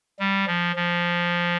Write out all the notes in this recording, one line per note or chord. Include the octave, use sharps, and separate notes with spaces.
G3
F3
F3